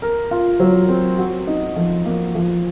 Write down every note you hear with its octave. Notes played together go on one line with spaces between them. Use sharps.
A#4
F4
F#3
C4
F#4
D#4
F3
A#3
F3